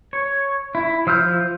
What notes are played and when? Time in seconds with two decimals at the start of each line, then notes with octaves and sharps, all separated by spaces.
0.13 C#5
0.75 E4
1.07 F3 E6 F6 G6